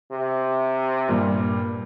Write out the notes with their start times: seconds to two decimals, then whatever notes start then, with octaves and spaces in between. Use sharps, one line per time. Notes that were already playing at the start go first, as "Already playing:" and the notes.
0.11 C3
1.08 G2 A#2